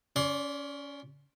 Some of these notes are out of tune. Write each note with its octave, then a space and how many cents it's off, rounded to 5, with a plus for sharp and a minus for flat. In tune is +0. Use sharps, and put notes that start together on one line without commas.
C#4 +20 D5 -20 C6 +20